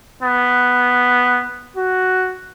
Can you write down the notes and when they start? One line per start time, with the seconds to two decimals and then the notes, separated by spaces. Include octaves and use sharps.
0.23 B3
1.77 F#4